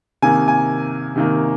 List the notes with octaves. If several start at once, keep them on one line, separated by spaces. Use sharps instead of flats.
C3 D#3 A#3 G#5
G#5
C3 D#3 A#3